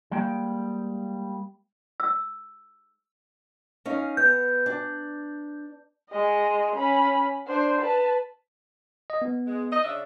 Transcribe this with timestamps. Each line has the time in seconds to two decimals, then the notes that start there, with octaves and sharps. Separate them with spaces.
0.11 G3 G#3 A#3 G5
2.00 E6
3.85 C#4 D#4 F5
4.17 B3 G6
4.66 D4
6.10 G#3 D#5
6.76 C#4 B5
7.47 D4 C5
7.81 B4 A5
9.10 D#5
9.22 B3
9.47 G#3
9.71 D#5
9.83 C#3 D4 E5